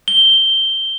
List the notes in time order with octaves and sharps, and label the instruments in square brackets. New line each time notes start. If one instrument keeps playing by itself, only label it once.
[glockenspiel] G7